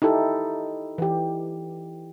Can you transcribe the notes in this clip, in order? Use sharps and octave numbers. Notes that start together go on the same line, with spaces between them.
D#4 E4 G4 A4
E3 G4